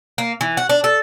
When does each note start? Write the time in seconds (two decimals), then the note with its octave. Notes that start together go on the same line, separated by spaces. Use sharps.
0.18 A#3
0.41 E3
0.57 F#4
0.69 D4
0.84 A4